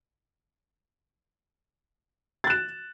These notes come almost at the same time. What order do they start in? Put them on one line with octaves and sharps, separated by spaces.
A6 F#6 E7